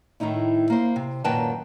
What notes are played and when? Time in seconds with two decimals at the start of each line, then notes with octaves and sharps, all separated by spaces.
0.20 A2 D#3 A3 D#4 E4
0.70 A#3 C5
0.96 C3
1.24 F#2 A#2 D#3 B4 G5 A5